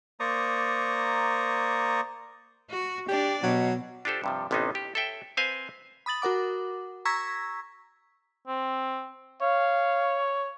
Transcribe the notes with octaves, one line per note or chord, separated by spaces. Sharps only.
A#3 C5 D5 A#5 C#6 D#6
F#4
D4 G4 D5
B2 F#3
D4 F4 G4 A4 C5
G2 C3 F3
A1 C3 B3 C#4 D#4 C5
G4
A4 C#5 E5 G5
C4 B4 C5 F5 G#5
B5 D#6 A6 F#7
F#4 A#4 F#5 D6
A#5 C#6 E6 G#6 A#6 B6
C4
C#5 F5